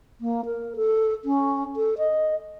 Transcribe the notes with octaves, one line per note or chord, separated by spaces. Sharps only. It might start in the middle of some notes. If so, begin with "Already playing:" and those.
A#3
A#4
A4
C#4
A4
D#5